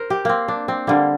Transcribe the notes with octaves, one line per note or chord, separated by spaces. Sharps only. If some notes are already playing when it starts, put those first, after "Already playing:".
Already playing: D#4 A#4 C5
G4
A#3 C4
D4
C4
D3 G3 A#3